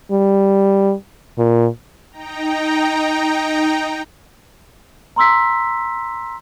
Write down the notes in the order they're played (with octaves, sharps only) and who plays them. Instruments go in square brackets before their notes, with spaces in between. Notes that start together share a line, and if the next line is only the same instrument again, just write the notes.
[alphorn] G3
A#2
[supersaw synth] D#4 G5 A#5
[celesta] A#5 C6 E6 B6